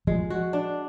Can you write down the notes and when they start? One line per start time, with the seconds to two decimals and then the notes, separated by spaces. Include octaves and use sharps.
0.07 F3 G#3
0.30 F#4
0.53 D4